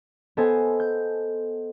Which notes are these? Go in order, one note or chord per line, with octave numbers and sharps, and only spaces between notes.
B3 A4 C5 D#5 G#5
G6